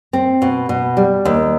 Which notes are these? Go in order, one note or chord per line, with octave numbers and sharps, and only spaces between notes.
C4
B2
B2
G3
D#2